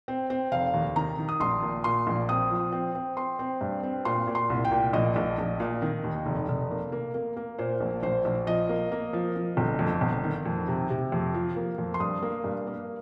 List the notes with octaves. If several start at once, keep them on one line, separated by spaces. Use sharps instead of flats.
C4
C4
F1 F5
D#2
D#3 A#5
D#3
D#6
A#1 C6
A#2
A#2 C6
A#1
C4 D#6
F3
C4
C4
C4 C6
C4
G2
C4
A#2 C6
A#2
C6
C2
G5
A#2
A#1 D#5
A#1
A#1
A#2
D#3
D#2
F1
F1
A#3
A#3
A#3
A#3
A#2 C5
A#1
A#1 C5
A#1
F3 D#5
A#3
A#3
F3
F3
G1
F2
G1
D#3
F2
C3
C3
F2
F3
A#3
F2
C6
G2 D#6
A#3
G2
A#3